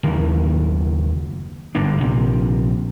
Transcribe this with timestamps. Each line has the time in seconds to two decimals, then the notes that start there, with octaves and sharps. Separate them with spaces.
0.03 F#1 D#2 D#3 E3
1.75 G1 G#2 D4
2.01 A#1 C3